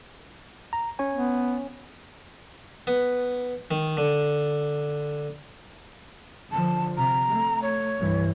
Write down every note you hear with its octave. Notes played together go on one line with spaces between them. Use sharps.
A#5
C#4 C#5 G#5
B3
B3
D#3
D3
D3 F3 A5
C3 A#5
A3
C#5
C2 G2 E3